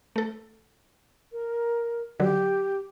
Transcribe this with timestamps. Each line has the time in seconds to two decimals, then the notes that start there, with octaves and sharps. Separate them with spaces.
0.16 A3 A4
1.32 A#4
2.20 D3 F#3 G4